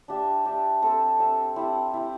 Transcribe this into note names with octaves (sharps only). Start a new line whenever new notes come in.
D4 G4 E5
D4 G4 E5
C4 A4 E5
C4 A4 E5
C4 E4 G4
C4 E4 G4